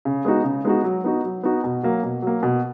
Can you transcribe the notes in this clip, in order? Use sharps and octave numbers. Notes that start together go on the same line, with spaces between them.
C#3
G#3 B3 D#4 F#4
C#3
G#3 B3 D#4 F#4
F#3
B3 D#4 F#4
F#3
B3 D#4 F#4
B2
F#3 A#3
B2
F#3 A#3
B2